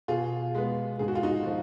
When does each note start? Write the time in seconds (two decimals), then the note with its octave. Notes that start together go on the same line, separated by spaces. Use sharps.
0.08 B2 F4 G#4
0.55 G#3 B3
0.99 G#2 G#4
1.08 F#4
1.15 F4
1.23 D#4 F#4
1.46 F3